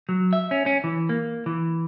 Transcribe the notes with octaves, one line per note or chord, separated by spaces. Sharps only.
F#3
E5
C#4
C#4
E3
A#3
E3